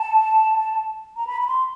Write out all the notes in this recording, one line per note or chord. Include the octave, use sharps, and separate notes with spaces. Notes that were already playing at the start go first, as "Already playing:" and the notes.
Already playing: A5
A#5
B5
B5
C6